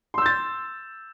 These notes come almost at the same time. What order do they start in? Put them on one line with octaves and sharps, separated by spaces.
C6 E6 G6 A6